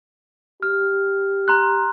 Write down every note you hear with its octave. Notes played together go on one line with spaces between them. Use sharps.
G4 F6
A#5 C6 F#6